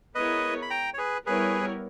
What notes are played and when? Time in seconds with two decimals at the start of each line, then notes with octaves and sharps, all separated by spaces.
0.15 G#3 B3 E4 A#4 B4 C#5 D#5
0.62 B5
0.70 G5 A#5
0.94 C#5
0.98 G#4 B4
1.26 G3 B3 E4 G#4 A#4 B4 C#5